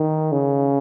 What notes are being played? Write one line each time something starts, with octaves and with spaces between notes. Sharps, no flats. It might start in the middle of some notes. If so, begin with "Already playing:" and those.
Already playing: D#3
C#3